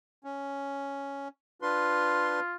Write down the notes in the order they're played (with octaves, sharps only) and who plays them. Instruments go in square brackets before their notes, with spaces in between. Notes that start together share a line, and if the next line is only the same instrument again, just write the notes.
[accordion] C#4
[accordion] D4 B4 C6 [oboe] F4